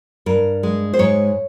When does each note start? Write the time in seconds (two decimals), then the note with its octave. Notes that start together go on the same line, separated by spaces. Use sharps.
0.26 G2 A#4
0.63 G#3
0.94 C5
0.99 G#2 C#5